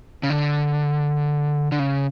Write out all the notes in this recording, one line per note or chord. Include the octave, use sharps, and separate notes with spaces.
C#3
D3
D3
C#3